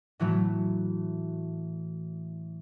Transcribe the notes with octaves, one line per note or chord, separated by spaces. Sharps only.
A2 E3 F#3 A3